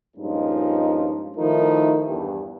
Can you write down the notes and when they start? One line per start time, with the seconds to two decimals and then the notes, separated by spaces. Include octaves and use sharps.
0.16 G2 A#2 F3 G#3 C#4 D#4
1.37 D#3 F3 A3 D#4 E4 A#4
2.05 E2 G2